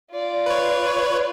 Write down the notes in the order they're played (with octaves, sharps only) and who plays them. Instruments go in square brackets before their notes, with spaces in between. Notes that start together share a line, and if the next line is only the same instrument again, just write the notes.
[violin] F4 D5
[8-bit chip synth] B4 C#5